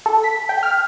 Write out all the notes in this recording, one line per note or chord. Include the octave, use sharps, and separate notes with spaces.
A4
B6
G5
F6